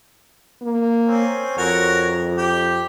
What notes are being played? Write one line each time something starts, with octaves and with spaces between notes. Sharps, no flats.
A#3
C4 C#4
F2 F#4 A#4 C#5
G4